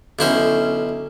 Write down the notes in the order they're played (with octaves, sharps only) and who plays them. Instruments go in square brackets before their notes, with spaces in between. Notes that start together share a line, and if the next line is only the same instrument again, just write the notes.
[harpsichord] B1 E4 C5 [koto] D3 C#4